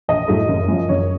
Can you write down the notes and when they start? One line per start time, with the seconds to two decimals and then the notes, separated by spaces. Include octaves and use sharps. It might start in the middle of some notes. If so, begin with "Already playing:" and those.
0.08 A#1 D#5
0.28 A2 F#3 A3
0.48 F#1
0.68 F#2 F3
0.89 F#1 C#5